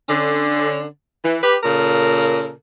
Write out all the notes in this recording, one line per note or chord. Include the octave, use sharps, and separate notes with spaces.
D3 C#4
E3
G4 B4
A#2 C#3 A4 A#4